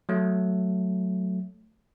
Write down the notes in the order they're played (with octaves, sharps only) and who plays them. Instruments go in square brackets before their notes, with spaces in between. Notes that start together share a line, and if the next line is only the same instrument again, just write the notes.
[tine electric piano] F#3 A3